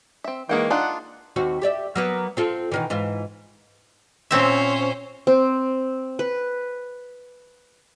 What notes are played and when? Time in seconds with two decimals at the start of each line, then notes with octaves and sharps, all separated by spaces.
0.24 C4 E5
0.49 D#3 E3 G#3 A#3 F#5 G5
0.70 D4 D#4 F4 F#5
1.36 D#2 C4 F#4
1.62 G4 D5 E5
1.96 F#3 A#3 B3
2.37 C4 F4 A4
2.72 B2 D#3 E3
2.90 G#2 E3 F4
4.31 A#2 C4 C#4 C5 E5
5.27 C4
6.19 B4